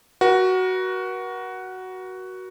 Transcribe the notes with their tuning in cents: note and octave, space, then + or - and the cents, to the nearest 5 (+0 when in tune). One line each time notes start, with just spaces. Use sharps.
F#4 +10 A#4 +45